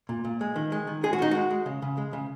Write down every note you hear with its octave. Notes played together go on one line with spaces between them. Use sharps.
A#2
A#2
G#3
D#3
G#3
D#3
G#3 G#4
F#4
D#3 D#4
G#3 F#4
G#3
C#3
C#3
G#3
C#3